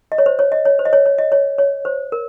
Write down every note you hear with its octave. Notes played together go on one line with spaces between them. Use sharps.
D#5
C#5
C5
C#5
D#5
C#5
C5
D#5
C#5
C#5
D#5
C#5
C#5
C5
A#4